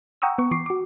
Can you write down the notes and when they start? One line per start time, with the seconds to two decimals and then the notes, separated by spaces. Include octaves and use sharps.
0.22 F#5 G5 A#5 C#6 D#6 E6
0.38 B3 C#6
0.51 E3 C#6 D6 C7
0.66 F#4 D6